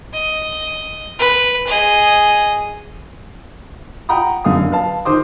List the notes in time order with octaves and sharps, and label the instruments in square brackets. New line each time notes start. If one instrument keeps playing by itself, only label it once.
[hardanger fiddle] D#5
B4
G#4 D#5
[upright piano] F#5 G5 A#5 B5 D#6
F#1 F#2 D3 F5 D#6
B4 F5 A5
D#3 C5 C6 D6 D#6